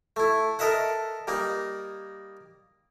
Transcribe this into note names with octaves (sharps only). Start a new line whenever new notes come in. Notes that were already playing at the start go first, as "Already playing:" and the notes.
A3 E4
A4 A#4 D#5 E5 F#5
G3 A#3 D#4